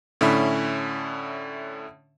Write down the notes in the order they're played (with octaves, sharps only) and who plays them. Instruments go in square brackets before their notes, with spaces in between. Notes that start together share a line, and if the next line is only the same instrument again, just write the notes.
[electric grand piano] A2 D3 C#4 E5 B5